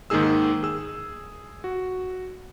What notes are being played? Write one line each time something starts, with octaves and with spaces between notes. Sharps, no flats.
G#2 D#3 A#3 D#4 G#4 E6
G#4 E6
F#4